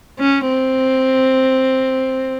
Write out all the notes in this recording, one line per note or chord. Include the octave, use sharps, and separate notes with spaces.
C#4
C4